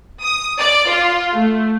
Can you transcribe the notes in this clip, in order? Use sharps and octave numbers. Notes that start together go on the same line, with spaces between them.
D#6
D5
F4
A3